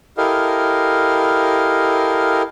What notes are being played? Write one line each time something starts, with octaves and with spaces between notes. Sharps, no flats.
E4 G4 A4 A#4 D#5 F5